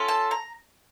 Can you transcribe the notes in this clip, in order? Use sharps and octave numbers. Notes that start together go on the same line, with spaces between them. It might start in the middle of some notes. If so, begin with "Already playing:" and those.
Already playing: C#4 F4 A4
A5
A#5